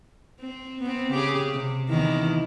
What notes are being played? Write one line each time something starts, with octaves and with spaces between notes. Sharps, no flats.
C4
B3 C4
C#3 G4 G#4
C3
E2 D#3 E4